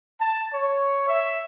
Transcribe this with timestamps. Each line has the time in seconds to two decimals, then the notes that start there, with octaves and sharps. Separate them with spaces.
0.21 A5
0.53 C#5
1.08 E5